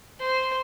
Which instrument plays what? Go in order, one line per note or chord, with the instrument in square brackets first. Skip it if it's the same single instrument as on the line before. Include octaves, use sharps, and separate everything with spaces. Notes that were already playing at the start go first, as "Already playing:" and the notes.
[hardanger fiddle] C5